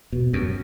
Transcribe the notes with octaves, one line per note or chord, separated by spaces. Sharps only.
B2
F#2